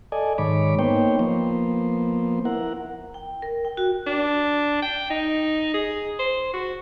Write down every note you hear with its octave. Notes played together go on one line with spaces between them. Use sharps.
A4 D5 D#5 G#5
G#2 D#3 C#5 B5 D6
A#3 B3 D#4 C5 C#5 G5
F3 A#3 B3 C5
E4 A#4 F#5
G5
A#4
G5
F#4
D4
G5
D#4
G#4
C5
F#4